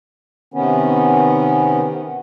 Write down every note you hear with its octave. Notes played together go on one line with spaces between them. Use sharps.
C3 D#3 B3 C#4